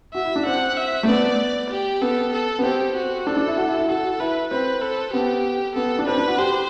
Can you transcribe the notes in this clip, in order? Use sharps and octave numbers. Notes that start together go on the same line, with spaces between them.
F#4 E5
E4
D4
C4 F#5
E5
A3
B3 D5
G4
B3 A4
A4
B3
C4 G4
F#4
D4 A4
D4
E4
F#4
E4
E4
F#4 A4
E4 B4
C4 B4
A4
B3 G4
B3 A4
D4
C4 B4
D4
F#4
G4 C5